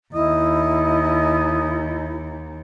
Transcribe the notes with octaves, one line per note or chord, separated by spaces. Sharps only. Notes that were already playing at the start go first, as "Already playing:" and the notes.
D#2 E4 D#5